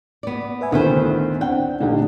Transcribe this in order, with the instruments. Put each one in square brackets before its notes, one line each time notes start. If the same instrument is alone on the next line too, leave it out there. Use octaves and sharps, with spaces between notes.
[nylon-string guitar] B3 D5
[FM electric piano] B4 E5 G#5
[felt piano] D2 A2 [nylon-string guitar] D#3 B4 C5 [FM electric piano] B3
[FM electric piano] C4 D4 [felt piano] F#5 [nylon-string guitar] G5
[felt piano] A#1 D3 [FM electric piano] A3 D#4 G4